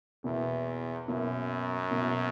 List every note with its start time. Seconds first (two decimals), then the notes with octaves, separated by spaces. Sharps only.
0.24 E2 B2 A#3 E4
1.07 F#2 B2 A#3 E4
1.91 B2 A#3 E4